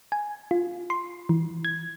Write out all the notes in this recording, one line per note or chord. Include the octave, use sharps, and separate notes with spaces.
G#5
F4
C6
E3
G#6